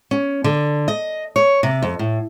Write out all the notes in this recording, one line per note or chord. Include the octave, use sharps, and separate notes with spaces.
C#4
D3
D#5
C#5
C3
F2
A2